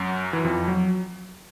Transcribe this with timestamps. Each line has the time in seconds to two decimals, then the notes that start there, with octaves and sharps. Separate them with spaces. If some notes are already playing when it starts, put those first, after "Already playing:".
Already playing: F#2 F#3
0.33 E3
0.44 F2 F3
0.68 F#3